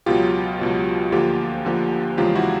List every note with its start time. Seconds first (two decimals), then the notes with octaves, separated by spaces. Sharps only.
0.06 C#2 B2 F#3 F4 G4
0.59 C#2 B2 F#3
1.12 D2 D3 F3 A#3 F4 G4
1.65 D2 D3 F3 A#3
2.18 E2 C#3 F3 G#3 F4 G4
2.35 E4 F#4